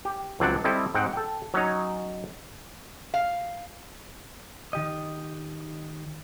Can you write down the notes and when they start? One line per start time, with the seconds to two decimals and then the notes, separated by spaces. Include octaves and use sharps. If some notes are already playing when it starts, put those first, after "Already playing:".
0.05 G4
0.40 C#2 F#3 C4 D4 D5 F#5
0.64 G3 C4 E4 A4 D#5
0.95 G#2 C4 F#5 G5
1.13 A4 G5
1.54 F#3 C#4 D#4 C#5
3.14 F5
4.73 D#3 G4 D#5